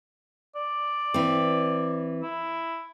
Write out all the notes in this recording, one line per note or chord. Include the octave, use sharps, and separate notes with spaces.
D5
E3 C4
E4